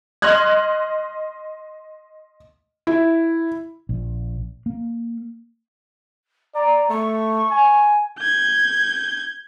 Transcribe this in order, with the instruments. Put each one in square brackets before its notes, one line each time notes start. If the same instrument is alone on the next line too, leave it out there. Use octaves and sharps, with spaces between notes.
[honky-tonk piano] D#5 C6 F6 F#6 G#6
[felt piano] E4
[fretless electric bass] A#1
A#3
[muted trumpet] D5 [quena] A#5
[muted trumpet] A3 [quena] C#6
[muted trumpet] G#5
[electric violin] G6 G#6